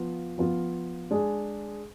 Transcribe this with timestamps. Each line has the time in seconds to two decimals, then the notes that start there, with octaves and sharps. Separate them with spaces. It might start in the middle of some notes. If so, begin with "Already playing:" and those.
Already playing: F3 B3 F4
0.38 F3 B3 F4
1.11 G#3 D4 G#4